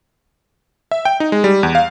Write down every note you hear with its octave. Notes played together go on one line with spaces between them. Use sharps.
E5
G5
D#4
G#3
G3
E2
F5